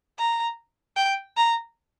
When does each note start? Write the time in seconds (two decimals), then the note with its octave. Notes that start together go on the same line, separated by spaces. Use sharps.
0.19 A#5
0.97 G5
1.37 A#5